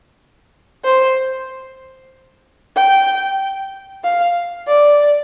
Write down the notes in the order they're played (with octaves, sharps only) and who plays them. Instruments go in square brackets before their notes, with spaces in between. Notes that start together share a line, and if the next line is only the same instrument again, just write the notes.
[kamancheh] C5
G5
F5
D5